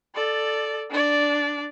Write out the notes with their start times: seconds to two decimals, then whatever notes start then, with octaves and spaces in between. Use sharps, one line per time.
0.15 A4 D5
0.91 D4 D5